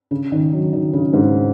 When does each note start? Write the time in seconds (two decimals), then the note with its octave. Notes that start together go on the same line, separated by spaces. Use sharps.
0.11 C#3
0.32 D#3
0.52 F#3
0.73 D#3
0.93 C#3
1.13 G#2